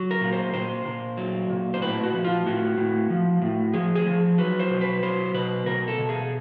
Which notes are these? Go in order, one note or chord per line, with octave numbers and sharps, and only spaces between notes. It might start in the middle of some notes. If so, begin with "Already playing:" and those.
Already playing: F#3
A#4
A#2
C5
A#2 C5
A#2
F#3
A#2
C5
A2 B4
F#4
F3
F4
A2 F#4
A2
F3
A2
F3 G#4
G#4
F3
F#3 B4
C5
B2
B4
F#3 C5
B2 B4
B2 A#4
A4
B2
G#4